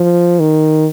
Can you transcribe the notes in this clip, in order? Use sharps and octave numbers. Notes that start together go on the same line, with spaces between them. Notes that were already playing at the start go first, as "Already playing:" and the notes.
Already playing: F3
D#3